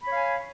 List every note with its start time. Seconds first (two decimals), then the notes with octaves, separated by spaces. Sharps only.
0.02 B5
0.07 C#5
0.12 F5
0.17 G#5